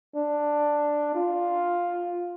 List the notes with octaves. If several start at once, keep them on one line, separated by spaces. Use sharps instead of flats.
D4
F4